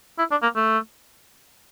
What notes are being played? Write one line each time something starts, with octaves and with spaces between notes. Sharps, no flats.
E4
D4
A#3
A3